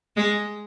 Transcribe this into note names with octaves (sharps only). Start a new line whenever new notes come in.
G#3